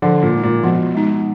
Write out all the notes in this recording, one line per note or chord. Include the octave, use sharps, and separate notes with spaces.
D3 F3
A#2
G#3 D#4
A#2
B2 F3
G#3 D#4